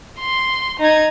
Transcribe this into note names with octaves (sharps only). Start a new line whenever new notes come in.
C6
D#4 G#6